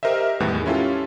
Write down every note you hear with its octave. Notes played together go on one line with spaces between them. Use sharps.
G4 A#4 C5 D#5 E5
E2 A2 D#3 G3 G#3 B3
C#4 E4 F4 G4 A4